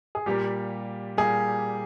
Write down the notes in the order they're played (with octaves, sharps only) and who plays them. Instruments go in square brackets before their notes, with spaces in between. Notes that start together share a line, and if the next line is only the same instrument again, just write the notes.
[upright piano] G#4
[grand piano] A#2 G3 A#3 [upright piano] G4
[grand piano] A#2 G3 A#3 [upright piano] G#4